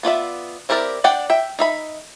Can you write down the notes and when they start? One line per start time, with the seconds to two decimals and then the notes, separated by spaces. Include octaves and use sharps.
0.03 B3 F4 D5 E5
0.69 C4 E4 G4 A#4 D5
1.04 D4 D5 F#5 G5
1.30 E5 G5
1.59 D#4 E5 B5